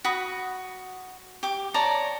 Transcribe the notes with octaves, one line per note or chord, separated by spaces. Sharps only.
F#4 B5 D#6
G4 D6
C#5 D5 A5 A#5